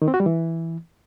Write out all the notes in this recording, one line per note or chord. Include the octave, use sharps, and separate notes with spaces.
D#3
C4
F#4
G3
E3